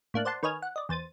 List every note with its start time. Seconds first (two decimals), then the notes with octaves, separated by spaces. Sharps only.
0.14 A2 A#3 D4 F#6
0.25 C5 D5 F#5 A5 C6
0.43 D#3 B4 C#5 D#5 G#5 F6
0.62 F#5
0.76 D5 D#5
0.89 E2 C5 A6 D#7